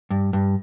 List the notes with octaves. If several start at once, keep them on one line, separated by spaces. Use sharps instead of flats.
G2
G2